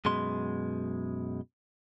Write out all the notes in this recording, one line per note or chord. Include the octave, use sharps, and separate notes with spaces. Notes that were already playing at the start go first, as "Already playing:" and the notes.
F#2 B2 G#3 C6